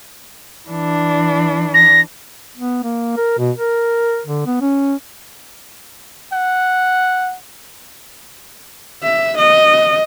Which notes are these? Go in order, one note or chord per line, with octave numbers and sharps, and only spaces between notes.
E3 D4
A#6
B3
A#3
A#4
B2
A#4
D3
B3
C#4
F#5
E5
D#5